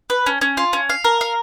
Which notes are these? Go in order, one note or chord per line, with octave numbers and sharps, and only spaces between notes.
B4
C#4
C#4
F4
C#4
F5
A#4
F5